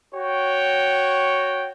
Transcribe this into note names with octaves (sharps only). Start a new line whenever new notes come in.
F#4 C#5 G5